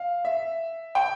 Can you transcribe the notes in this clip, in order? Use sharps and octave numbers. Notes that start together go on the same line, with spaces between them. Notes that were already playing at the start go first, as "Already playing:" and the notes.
Already playing: F5
E5
G5